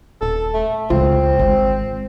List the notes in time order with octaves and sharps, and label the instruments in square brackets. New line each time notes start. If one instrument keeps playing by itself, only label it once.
[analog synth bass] D#1 [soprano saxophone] A4
[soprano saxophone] A3
[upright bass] C#2 [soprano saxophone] C4 [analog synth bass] F4
[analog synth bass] G#1 [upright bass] G#3